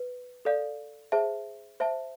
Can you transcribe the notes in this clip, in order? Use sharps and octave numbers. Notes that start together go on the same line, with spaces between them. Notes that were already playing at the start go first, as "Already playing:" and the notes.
Already playing: B4
A4 D5 F5
G#4 C5 E5 A5
C5 E5 A5